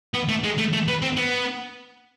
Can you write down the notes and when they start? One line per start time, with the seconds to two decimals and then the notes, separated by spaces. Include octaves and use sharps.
0.14 B3
0.28 A3
0.43 G#3
0.58 A3
0.73 A3
0.88 B3
1.02 C4
1.17 B3